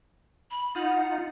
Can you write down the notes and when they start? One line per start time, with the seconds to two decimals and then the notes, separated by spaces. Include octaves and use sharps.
0.51 B5
0.75 D#4 F4 F#5